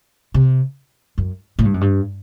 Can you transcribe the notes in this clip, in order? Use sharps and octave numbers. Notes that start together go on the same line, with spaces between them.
C3
F#2
A2
G2
F#2
G2